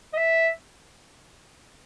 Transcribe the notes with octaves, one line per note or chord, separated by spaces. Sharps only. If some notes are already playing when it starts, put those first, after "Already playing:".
D#5
E5